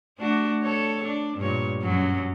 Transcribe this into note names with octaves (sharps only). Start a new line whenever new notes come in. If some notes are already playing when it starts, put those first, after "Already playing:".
A3 D4 F#4
A4 C#5
D4
G2 A#2 C#5
F#2 F#3 C#4